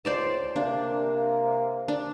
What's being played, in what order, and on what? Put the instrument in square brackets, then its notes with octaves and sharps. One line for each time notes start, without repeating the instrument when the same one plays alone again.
[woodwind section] C#2 [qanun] C5 D5 A5
[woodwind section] C3 A#3 [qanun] D4
[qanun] D4